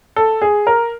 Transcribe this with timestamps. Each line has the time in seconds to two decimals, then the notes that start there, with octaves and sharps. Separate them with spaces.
0.16 A4
0.42 G#4
0.67 A#4